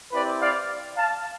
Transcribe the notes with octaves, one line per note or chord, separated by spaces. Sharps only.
C4 E4 G4 B4 D5
D5 F5
F5 A5